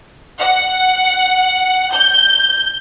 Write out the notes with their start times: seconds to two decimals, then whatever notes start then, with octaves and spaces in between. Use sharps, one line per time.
0.40 F#5
1.93 G6